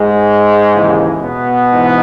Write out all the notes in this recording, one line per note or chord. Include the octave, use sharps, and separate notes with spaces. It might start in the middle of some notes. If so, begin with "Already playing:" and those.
Already playing: G#2 G#3
D#2 C#3 E3
B2 B3
G#2 E3